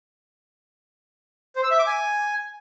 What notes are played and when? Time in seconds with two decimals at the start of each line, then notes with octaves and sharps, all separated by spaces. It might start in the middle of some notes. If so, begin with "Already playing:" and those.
1.56 C5
1.64 E6
1.71 E5
1.79 D6
1.87 G#5